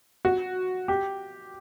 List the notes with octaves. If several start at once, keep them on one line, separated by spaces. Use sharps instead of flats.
F#4
G4